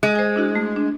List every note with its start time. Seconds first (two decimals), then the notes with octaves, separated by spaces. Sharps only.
0.03 G#3
0.15 C5 G#5
0.36 D4 E4 F#4
0.55 A3
0.76 D4